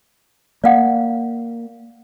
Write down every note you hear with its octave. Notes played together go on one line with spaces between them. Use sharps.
A#3 D5 F5 F#5